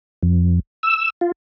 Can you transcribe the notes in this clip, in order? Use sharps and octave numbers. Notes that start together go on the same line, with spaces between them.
F2
E6
F4